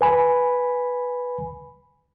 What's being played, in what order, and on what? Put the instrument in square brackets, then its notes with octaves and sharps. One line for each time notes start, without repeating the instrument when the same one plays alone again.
[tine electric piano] B4 G#5 B5